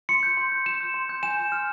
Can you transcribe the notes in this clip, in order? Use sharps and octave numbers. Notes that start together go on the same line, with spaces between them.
C6 C#7
G6
C6
G6
C6 E7
G6
C6
G6
G#5 E7
C6
F6